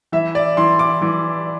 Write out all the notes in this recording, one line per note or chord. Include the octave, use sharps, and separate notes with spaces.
E3 E5
D5
E3 C6
D6
E3